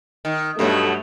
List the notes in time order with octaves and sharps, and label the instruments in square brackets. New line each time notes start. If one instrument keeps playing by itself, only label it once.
[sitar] D#3
[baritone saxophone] G2 [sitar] B2 F#3 [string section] A3